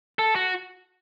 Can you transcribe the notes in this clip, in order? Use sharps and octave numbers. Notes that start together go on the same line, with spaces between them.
A4
F#4